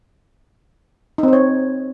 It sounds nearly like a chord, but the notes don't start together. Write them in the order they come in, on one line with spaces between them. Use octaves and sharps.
D#4 C4 C5 C#5